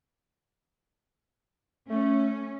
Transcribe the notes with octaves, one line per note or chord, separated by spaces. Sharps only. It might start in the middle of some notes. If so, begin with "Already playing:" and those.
A3 C#4